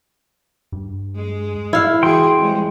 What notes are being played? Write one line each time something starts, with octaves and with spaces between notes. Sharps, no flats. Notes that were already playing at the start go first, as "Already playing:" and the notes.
G2
G#3
E4 F5
E3 F#4 G#4 G5 C6
F2 G3 G#3